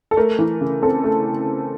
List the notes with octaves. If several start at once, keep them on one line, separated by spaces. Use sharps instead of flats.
A4
A3 A#4
E3
C#3
C4 A4
A3